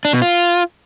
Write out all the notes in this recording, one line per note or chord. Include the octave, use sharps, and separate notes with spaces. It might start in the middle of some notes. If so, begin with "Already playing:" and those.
D4
B2
F4